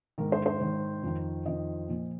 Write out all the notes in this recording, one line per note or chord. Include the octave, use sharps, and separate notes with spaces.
G#2 D#3 A#4
C5
C5
G#2 D#3
F2 D#3
F2 D#3 D#5
A#2 F3